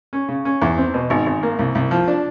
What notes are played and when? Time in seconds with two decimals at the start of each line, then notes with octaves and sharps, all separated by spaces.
0.13 C#4
0.28 C#3
0.45 C#4
0.62 E2
0.78 C4
0.94 B2
1.10 G#1
1.26 G#1
1.43 A#3
1.59 C2
1.75 C2
1.91 F3
2.08 D4